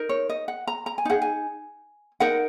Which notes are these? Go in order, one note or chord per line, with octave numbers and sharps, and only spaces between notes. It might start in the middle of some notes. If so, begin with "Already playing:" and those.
Already playing: D#4 A#4
C#5
D#5
F#5
A#5
A#5
G#5
D#4 G#4 F#5
G#5
D#4 A#4 F#5